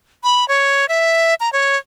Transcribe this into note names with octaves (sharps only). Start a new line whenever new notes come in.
B5
C#5
E5
A#5
C#5